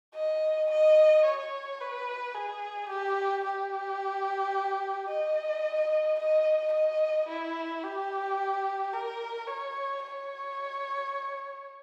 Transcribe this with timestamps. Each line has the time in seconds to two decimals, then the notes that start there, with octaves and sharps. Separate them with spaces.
0.15 D#5
0.71 D#5
1.25 C#5
1.80 B4
2.35 G#4
2.89 G4
3.44 G4
5.09 D#5
6.19 D#5
6.73 D#5
7.28 E4
7.84 G4
8.93 A#4
9.47 C#5
10.03 C#5